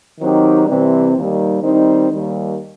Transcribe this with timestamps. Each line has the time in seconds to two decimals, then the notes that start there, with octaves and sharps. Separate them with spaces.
0.20 D#3 F#3 C4 D#4 G4
0.67 C3 E3 G3 C4
1.16 D#2 D#3 G3
1.63 D#3 G3 C4 D#4
2.11 D#2 D#3 G3